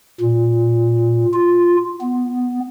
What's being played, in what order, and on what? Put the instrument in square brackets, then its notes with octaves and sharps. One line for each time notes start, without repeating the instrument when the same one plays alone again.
[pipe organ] A#2
F4
B3